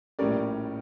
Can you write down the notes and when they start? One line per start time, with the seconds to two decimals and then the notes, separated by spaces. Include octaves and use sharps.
0.19 A#1 A2 G3 C#4 A#4 D5